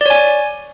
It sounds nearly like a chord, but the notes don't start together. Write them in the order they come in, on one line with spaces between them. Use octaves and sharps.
D5 C#5 G#5